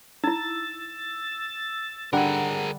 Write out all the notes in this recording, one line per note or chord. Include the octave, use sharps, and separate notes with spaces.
D#4 E4 E6 A6
D3 G3 G#4 A#4 F#5